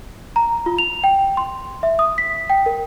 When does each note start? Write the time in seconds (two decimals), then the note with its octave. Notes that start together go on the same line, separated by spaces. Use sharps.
0.36 A#5
0.66 F4
0.78 F7
1.04 G5
1.37 C6
1.83 E5
1.99 D#6
2.18 B6
2.50 G5
2.66 A#4